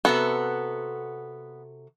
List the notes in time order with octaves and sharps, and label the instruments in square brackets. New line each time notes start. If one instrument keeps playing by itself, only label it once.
[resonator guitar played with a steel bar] C3 F#4 A4 [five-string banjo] B3